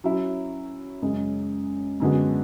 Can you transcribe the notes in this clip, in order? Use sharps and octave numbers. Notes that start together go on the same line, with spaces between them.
F#3 C#4 E4
F#2 C#3 G#3 C#4
F#2 D3 G#3 B3 F#4